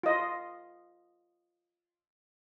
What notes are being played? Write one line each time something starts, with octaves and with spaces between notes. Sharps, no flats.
F4 D#5